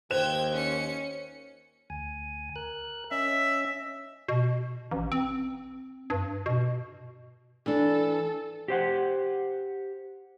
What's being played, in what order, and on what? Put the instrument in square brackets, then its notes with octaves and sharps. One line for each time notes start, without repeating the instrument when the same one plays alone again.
[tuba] D#2 [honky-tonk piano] C5 F#6 E7 [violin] G5 G#6
[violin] C#4 C#7
[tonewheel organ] D2 G#5
A#4 F#6
[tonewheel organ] C#4 D#5 [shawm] E5
[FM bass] B2
A1
C4
G2
B2
[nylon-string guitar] E3 D4 [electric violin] A4
[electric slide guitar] G4 C5 F#5